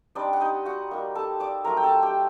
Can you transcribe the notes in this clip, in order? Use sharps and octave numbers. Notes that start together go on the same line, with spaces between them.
G3 C4 D4 D#4 D5
F#5
D#4 D#5
F#4 F#5
G3 A#3 D#4
A4 A5
D5 D6
F#3 A3 C4 A#4 A#5
G5
A4 A5
G4 G5